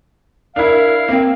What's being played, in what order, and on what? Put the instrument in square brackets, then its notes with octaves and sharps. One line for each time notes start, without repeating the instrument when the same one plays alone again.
[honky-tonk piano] D4 E4 [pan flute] A#4 [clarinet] F5
[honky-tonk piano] A#3 [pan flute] C4